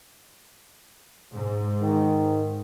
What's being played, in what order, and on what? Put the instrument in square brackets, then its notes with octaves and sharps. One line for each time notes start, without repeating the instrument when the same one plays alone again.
[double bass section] G#2
[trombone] D#3